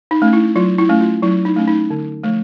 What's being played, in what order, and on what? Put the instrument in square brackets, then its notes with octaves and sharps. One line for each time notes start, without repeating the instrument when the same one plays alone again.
[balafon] D#4
A3 C#4
E4
F#3 F4
E4
A3 C#4
F4
F#3 E4
D#4
A3 C#4
D#4
D3
F3 A3